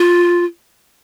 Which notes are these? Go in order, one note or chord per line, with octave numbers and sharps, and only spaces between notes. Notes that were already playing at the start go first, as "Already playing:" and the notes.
Already playing: F4